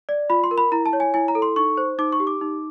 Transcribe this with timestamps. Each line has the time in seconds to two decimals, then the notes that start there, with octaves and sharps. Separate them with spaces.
0.09 D5
0.30 F4 B5
0.44 C6
0.51 A#4
0.58 B5
0.72 E4 A#5
0.86 A5
0.93 C#5
1.00 G#5
1.14 E4 G#5
1.28 A#5
1.35 A4
1.42 C6
1.56 D#4 C#6
1.77 C5
1.99 D#4 D6
2.12 C#6
2.20 G4
2.27 D6
2.41 D#4